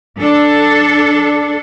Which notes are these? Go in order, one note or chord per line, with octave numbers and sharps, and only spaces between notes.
D4 A4